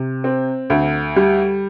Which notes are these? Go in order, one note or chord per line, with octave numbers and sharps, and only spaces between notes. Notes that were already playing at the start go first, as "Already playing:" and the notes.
Already playing: C3
C4
D2
G3